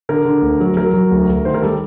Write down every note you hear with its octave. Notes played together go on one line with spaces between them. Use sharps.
D3 A#4
D3
D2
F#3
F#3 A#4
F#3
D2
D2
D#3 C5
A#4
G3 A4